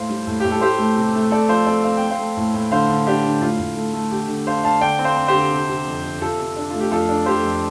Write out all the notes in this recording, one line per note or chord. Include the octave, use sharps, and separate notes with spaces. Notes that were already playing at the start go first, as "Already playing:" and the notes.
Already playing: A2 C5 F5
G3
A2
A2 G4
A4
A3 G4 C5
A3
C3
A3
C4 A4 D5
F3 C5 F5
C4 A4 D5
C4 F5
G5
C4
C5 F5
A3
A2
A2
D3 C5 F5
D3
D4 G4
D3
A2 F4
A2
A3
A3
D3 G4
D3
D4 C5 F5
D4 F5 A5
D3 D5 G5
C4
C5 F5
C4
G4 C5
D3
C3
C3
F2
C3
C3 F4 A4
C3
D4
A3 F4
G4
F2 F4 A4
D4
F2 G4 C5
F2